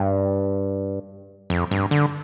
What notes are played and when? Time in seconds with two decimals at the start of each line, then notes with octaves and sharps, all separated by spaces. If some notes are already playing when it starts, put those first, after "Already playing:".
Already playing: G2
1.50 F2
1.71 G2
1.91 D3